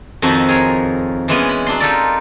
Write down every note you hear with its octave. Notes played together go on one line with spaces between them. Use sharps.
F2 D#3 F3 C4 F#4
G#4 A#4 C#5
E3 G#3 B3 C#4
B5
F#3 D4 C6
D#4 F4 G4 A4 A#4 D5